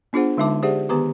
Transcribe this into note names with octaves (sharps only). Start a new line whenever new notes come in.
B3 D4 F4 G#4 C5 F#5
D3 G#3 D#4 E5 A5 D6
G4 G#4 C5 D5 E5 F#5
D#3 B3 G4 B4 A#5 D6